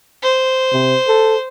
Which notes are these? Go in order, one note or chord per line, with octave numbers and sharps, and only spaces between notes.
C5
C3
A4